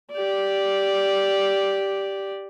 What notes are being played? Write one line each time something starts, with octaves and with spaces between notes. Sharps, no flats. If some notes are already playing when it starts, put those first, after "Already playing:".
G4 D5